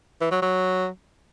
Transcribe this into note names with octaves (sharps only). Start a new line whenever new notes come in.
E3
F#3
F#3